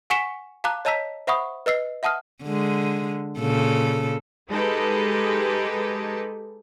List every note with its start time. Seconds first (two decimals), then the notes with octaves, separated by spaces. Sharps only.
0.10 F#5 G#5 C#6 B6 C#7 E7
0.64 F5 A5 A#5 D6 F#6
0.85 C#5 D#5 A5 A#5 E6 B6
1.27 C5 E5 F#5 B5 C#6 D#6
1.66 B4 D#5 E6 C7
2.03 E5 F#5 A5 D#6 F6
2.44 D3 G#3
3.40 A#2 C#3 A4
4.50 G#3 D#4 G4 A4 B4